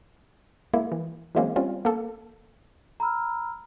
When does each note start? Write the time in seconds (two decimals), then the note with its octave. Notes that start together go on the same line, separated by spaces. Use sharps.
0.74 G#3 A#3 E4
0.92 E3
1.35 E3 F#3 G#3 A#3 C4 C#4
1.56 G3 C4 C#4 F4
1.85 A#3 A4
3.00 A#5 B5 E6 F6